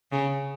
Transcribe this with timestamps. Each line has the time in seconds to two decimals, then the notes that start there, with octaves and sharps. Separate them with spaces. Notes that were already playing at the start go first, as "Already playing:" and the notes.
0.12 C#3